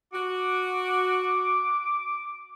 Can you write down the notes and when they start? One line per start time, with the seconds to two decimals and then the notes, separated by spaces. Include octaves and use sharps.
0.13 F#4 D6